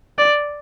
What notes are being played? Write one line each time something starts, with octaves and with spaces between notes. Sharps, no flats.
D5